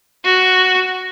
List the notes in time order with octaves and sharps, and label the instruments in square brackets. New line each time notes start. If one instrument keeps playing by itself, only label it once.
[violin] F#4